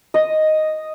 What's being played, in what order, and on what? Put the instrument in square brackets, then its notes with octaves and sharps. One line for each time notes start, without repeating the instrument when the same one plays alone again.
[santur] D#5